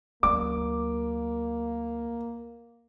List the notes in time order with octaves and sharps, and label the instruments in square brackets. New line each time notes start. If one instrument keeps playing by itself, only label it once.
[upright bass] D2 F#3 [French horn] A#3 [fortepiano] D6